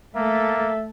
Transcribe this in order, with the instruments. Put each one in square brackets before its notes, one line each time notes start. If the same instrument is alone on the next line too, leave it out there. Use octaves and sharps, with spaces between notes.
[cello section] A3 A4 [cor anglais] A#3 [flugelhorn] E5